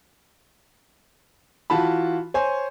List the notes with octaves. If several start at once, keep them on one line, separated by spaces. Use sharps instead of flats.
E3 F4 F#4 A5 B5
C5 C#5 G#5